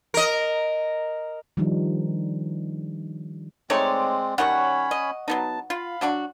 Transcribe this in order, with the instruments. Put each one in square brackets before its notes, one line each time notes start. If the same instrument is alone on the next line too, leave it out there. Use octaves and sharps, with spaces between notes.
[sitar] A#4 D#5
[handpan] D#3 F3 G3 D4 D#4
[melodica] G#3 C4 [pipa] A3 D#4 C#5 [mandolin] D5
[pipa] D#3 G3 [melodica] C#4 C#5 B5 [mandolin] F#5 C#6
[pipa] D#5
[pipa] F#3 B3 D#4 [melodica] A5
[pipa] F4 [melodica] F5 B5
[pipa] F#3 D4 F#4